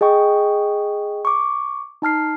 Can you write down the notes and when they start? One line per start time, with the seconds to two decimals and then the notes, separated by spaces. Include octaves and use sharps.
0.01 G#4 D#5 G5 C#6
1.25 C#6 D6
2.02 D#4 A5 F6 C7